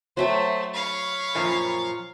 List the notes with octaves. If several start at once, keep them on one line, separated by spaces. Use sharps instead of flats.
F#3 A3 C5 E5 G5
C#5 F5 B5
F#2 A#2 F3